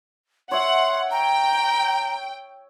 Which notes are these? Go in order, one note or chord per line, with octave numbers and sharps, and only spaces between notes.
C#5 E5 F#5 C6
G5 A#5